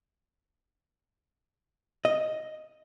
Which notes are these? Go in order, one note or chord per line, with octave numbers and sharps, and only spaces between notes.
D#5